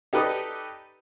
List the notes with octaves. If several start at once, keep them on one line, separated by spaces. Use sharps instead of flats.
D#4 G4 A4 B4 D5 D#5